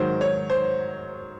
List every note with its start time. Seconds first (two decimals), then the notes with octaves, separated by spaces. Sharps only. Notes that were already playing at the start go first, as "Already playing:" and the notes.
Already playing: G#2 D#3 F#3 C5
0.21 C#5
0.50 C5